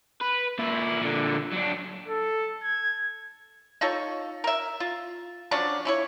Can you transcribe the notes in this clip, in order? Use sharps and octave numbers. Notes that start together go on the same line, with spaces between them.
B4
A#2 E4
A#2 D3
F#3 D4
A4
G#6
D#4 F4 A4 C#5
A#4 E5
F4
F3 F#3 C#4 D4
C#4 E4 C#5